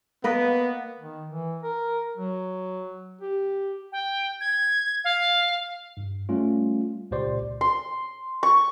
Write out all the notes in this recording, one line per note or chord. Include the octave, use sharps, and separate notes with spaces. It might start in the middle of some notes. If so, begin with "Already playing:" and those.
A#3 B3 B4 D#5
D#3
E3
A#4
F#3
G4
G5
G#6
F5
G2
G3 A3 C#4 F4
C#2 A#2 G4 C5 D5 C6
C6
C#6